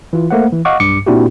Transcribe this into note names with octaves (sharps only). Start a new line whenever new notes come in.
E3 F4
A3 A#3 C5 F#5
E3
D#5 F5 F#5 C#6 D6
B1 G2 D6 C#7
A#2 C4 D4 E4 F#4 G4